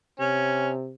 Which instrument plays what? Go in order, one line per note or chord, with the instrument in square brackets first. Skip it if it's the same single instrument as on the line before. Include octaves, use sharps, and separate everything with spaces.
[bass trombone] C3 [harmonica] C#4